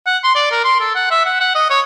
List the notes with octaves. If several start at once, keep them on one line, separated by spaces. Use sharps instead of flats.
F#5
C6
D5
A#4
C6
A4
F#5
E5
F#5
F#5
D#5
C#5